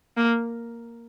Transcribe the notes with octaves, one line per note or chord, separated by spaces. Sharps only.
A#3